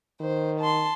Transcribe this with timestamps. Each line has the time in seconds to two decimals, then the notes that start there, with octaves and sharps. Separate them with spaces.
0.21 D#3 C5
0.61 A5 C6